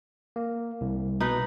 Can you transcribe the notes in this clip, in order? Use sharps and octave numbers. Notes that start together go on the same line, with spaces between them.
A#3
C2
B2 D#4 B4